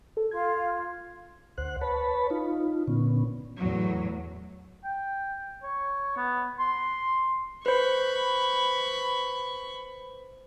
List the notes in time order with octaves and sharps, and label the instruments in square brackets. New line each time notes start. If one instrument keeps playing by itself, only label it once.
[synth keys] A4
[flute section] F4 [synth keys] G#6
[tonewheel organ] D2 C5 F#5 F#6
B4 C#5 A5 B5
D#4 F4
A#2 D3 B3 C#4
[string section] E2 A2 F#3
[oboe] G5
C#5
B3
C6
[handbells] B4 C5 [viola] B5 C#6